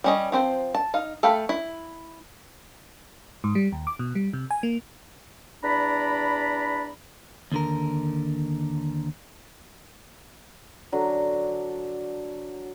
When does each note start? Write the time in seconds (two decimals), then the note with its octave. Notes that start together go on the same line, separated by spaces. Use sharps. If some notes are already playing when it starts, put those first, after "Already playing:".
0.04 G3 C#4 D#5
0.32 F3 C4 C5
0.75 A5
0.94 D#4 F5
1.23 A3 A4 F5 G5 B5
1.49 E4
3.44 G#2
3.55 G3
3.72 D#2
3.87 D6
3.99 B2
4.15 G3
4.33 C3
4.51 G#5
4.63 A#3
5.64 E2 D4 D5 A#5 B5
7.52 D#2 D3 A#4
10.92 D3 F#3